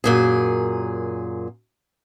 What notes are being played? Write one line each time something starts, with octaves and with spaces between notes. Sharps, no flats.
F#2 A#2 G#4